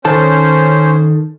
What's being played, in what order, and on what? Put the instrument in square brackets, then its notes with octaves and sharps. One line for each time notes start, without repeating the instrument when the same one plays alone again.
[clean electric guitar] D#3 A4 A5 [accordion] C#4 C5